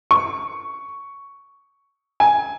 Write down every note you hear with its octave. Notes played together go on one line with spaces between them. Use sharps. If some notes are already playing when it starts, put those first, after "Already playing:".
C#6
G#5